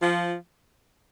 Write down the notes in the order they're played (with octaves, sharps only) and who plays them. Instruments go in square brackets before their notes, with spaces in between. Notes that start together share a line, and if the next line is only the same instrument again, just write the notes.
[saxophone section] F3